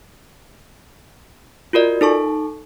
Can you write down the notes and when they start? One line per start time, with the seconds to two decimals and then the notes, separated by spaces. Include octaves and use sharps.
1.73 F4 F#4 A#4 D5 D#5
2.01 D#4 A4 A5 C#6